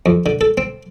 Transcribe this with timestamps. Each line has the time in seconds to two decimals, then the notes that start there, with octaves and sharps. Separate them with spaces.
0.06 F2
0.26 D3
0.41 A4
0.58 C4